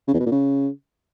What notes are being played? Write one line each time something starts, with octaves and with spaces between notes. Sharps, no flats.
C#3
E2
B2
A#2
C#3